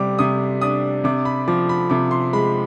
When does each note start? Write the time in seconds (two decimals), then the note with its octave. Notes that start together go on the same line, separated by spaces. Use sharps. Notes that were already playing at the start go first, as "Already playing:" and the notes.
Already playing: C3 G3 D6
0.19 C3 D#6
0.61 D4 D#6
1.04 C3 D6
1.25 B5
1.48 F3 D6
1.69 B5
1.90 C3 D6
2.11 C6
2.33 G#3 B5